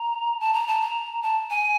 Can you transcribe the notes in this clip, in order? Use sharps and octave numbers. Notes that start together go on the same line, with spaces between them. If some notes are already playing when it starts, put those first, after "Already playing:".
Already playing: A#5
A5
A#5
A5
A#5
A5
G#5